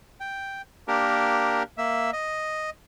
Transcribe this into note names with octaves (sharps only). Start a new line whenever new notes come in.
G5
A#3 D4 G4 A#4
A#3 E5
D#5